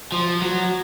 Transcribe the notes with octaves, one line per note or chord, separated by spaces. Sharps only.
F3
F#3